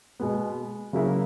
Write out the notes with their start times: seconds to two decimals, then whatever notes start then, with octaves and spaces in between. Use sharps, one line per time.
0.20 B2 G#3 B3
0.93 C#3 F#3 A#3 E4 G#4